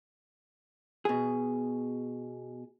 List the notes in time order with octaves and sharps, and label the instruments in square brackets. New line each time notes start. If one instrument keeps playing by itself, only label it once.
[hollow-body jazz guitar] B2 G#4